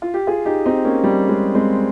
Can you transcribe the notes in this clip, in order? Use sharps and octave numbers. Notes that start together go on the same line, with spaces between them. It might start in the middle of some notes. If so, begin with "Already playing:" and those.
F4
G4
F4 G#4
D#4 G4
C4 D#4
A#3 C#4
G3
G#3
G#3 C4